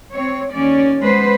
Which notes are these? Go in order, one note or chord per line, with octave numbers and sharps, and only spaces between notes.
C4 C#5
D#2 C#4 D5
G#3 B3 B4 C5